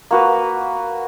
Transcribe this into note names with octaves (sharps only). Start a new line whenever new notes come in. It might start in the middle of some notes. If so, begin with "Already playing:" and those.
A#3 F#4 B4